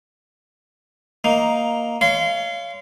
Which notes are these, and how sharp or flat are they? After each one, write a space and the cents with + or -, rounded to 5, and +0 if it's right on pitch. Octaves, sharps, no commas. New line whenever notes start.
A#3 +0 D#4 +5
C#5 +25 F5 -25 C6 -25